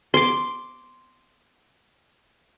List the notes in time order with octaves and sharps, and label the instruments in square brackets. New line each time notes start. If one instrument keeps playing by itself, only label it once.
[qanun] C6 D6